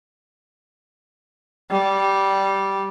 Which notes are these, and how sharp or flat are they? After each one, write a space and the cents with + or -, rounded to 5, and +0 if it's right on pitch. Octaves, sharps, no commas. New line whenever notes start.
G3 -10